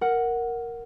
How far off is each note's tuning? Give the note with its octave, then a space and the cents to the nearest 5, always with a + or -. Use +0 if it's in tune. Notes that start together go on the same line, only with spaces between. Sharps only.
A#4 +0 F#5 +0